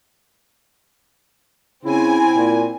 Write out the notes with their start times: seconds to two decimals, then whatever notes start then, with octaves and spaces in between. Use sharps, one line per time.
1.85 C#3 C4 E4 G#5
2.36 A#2